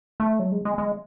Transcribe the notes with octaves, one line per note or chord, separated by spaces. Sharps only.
A3
F#3
G#3
G#3
G#3